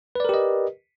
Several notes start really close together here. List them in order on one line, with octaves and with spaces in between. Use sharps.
B4 D5 A#4 G4 D#5